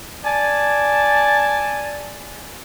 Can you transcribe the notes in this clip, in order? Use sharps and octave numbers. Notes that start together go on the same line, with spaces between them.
D5 G#5 A5